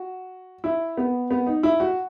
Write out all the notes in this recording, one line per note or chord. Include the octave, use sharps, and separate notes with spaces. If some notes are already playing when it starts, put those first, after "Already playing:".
Already playing: F#4
E4
B3
B3
D#4
E4
F#4